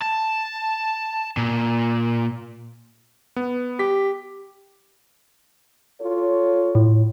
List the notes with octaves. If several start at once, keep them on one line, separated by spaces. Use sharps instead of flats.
A5
A#2
B3
G4 B6
F4 A4 C#5
A2